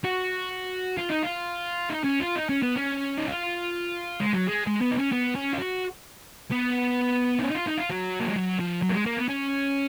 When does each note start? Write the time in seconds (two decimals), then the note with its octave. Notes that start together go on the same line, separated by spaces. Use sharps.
0.04 F#4
0.97 F4
1.10 D#4
1.23 F4
1.90 D#4
2.04 C#4
2.20 F4
2.36 D#4
2.49 C#4
2.63 B3
2.76 C#4
3.18 D#4
3.28 F4
4.20 G#3
4.33 F#3
4.47 G#3
4.67 G#3
4.81 B3
4.91 D#4
4.98 C#4
5.12 B3
5.36 C#4
5.54 F4
5.59 F#4
6.51 B3
7.39 D#4
7.44 C#4
7.51 D#4
7.55 F4
7.67 D#4
7.78 F4
7.90 F#3
8.20 A#3
8.28 G#3
8.36 F#3
8.59 F3
8.82 F#3
8.90 A#3
8.94 G#3
9.06 A#3
9.17 B3
9.29 C#4